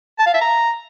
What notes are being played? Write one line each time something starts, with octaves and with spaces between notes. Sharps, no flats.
A5
F5
E5
A#5